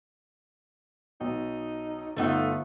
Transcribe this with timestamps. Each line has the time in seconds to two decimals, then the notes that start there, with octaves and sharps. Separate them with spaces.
1.21 B1 D#4
2.16 G1 A3 D#4 F4 F#5